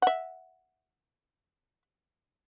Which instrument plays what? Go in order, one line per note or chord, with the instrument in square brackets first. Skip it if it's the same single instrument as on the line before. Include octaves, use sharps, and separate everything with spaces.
[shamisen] E5 F#5